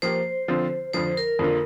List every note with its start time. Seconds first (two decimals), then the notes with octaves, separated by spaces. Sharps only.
0.02 F3 A#3 G4 C5
0.48 D3 F3 C4 F4
0.94 F2 D3 F3 C5
1.17 A#4
1.39 F2 D3 A#3 F4